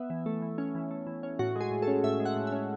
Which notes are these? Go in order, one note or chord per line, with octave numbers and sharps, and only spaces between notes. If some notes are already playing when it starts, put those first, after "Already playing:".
Already playing: B3 E5
E3
A3
E3
C#4
E3
A3
E3
C#4
A2 F#4
G#3 G#4
A2
A4
C#4
A2 E5
G#3
F#5
A2
C#4 E5